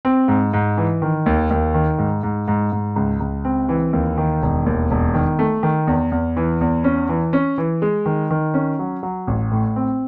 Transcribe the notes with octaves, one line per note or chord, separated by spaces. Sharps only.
C4
G#2
G#2
E3
D#3
D#2
D#2
D#3
G#2
G#2
G#2
G#2
C#2
C#2
C4
E3
D#2
D#3
E1
D#2
E1
D#3
A3
D#3
E2
E2
E3
E2
C#4
E3
C#4
E3
G#3
D#3
D#3
C#4
F#3
F#3
A1
A2
C4